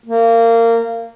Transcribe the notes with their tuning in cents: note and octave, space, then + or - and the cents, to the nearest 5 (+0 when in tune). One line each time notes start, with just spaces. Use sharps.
A#3 -25